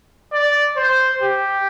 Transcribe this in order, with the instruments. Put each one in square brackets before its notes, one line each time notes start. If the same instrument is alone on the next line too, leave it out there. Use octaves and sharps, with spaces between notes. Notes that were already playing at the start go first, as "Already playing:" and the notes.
[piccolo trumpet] D5
C5
G4